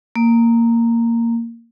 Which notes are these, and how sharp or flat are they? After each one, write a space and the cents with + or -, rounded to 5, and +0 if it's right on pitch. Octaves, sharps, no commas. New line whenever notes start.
A#3 -10